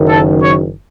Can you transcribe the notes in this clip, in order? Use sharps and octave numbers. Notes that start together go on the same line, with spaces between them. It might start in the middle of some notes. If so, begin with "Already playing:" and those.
Already playing: F#1 F#2 D#3
A4
C#5